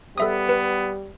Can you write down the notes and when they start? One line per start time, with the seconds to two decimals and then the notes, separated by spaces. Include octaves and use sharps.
0.18 G3 B3 A4 E5 D#6
0.49 B4